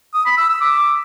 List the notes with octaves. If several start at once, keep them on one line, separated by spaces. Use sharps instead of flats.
D#6
B5
E6
E6
D6